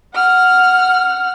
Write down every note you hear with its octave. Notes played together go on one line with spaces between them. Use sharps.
F#5 F6